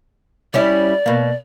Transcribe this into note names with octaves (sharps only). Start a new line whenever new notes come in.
G3 C#4 E4 D5
B2 A#3